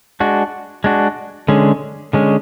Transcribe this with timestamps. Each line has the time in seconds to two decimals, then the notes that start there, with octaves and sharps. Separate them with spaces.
0.20 G#3 D4 F#4
0.84 G#3 D4 F#4
1.48 D3 G#3 C#4
2.13 D3 G#3 C#4